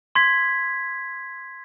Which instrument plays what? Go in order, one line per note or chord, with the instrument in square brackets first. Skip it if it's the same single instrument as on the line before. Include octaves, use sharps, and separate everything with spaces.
[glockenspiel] C6 G#6 B6